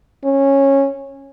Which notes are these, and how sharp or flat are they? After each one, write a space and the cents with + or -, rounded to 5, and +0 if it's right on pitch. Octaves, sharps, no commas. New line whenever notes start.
C#4 -15